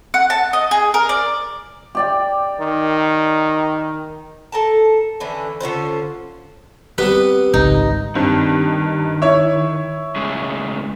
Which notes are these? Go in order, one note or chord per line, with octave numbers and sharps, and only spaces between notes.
F#5
A5
D#5
G#4
A#4
D5
G4 D5 G5
D#3
A4 A#4 A5
D3 E3 C#4 D4
D3 C#4 F4 C5
G3 B3 C4 B4
G#1 C#2 D#4
G2 D#3 C4
E4 C#5
A2 C#3 G#3